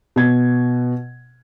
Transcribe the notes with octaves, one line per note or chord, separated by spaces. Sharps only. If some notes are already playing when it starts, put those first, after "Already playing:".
B2 G#6